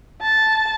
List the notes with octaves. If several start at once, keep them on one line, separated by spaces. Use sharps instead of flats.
A5